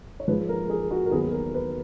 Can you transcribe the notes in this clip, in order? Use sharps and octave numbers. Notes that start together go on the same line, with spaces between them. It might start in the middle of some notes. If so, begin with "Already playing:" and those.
C#5
G#2 F3 G#3 B4
A#4
G#4
F#4
A#4
D#2 D#3 F#3 B3 G#4
A#4
B4